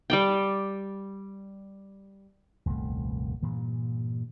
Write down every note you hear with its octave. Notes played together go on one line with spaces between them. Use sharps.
G3 D5 G5
D#1 C2 F#2 A3
G2 A#2 E3